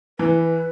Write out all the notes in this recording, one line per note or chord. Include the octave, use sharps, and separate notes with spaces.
E3 B4